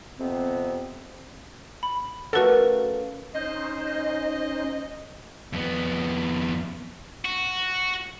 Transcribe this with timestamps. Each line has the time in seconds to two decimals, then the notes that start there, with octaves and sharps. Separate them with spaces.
0.18 F2 C3 B3 C4
1.83 B5
2.33 A3 A#3 C#4 F#4 A4 B4 F#5
3.35 C#4 D#4 C5 D#5
5.53 F2 B3
7.25 F#4